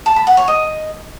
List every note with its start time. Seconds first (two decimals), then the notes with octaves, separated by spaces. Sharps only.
0.06 A5
0.16 B5
0.27 F#5
0.37 C#5
0.48 D#5